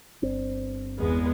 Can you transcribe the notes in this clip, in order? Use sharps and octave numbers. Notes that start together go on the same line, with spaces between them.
G1 C4 D4
E2 G#3 B3